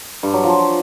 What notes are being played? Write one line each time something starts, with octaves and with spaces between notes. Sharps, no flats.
G2
F#3
F3